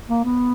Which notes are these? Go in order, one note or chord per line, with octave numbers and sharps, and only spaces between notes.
A#3
B3